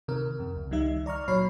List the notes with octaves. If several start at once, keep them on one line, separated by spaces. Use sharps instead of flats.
C3 D#3 A#4
F2 C3
C#2
C#2 D#3 G3 D#4 E5
D5 A#5 C#6 F6
A#2 F#3 C#5 B5 C7